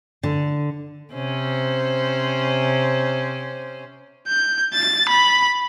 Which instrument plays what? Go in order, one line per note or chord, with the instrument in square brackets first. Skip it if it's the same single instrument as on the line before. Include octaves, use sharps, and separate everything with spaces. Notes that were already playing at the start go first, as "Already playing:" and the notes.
[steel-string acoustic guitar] D3
[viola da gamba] C3 C#4 C5
[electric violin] G6
A6
B5